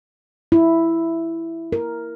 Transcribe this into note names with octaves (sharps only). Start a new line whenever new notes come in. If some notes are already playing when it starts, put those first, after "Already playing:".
E4
A#4